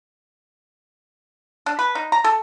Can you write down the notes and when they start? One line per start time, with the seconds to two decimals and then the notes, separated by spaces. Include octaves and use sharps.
1.66 D4
1.79 B4
1.95 D#4
2.12 A#5
2.24 A4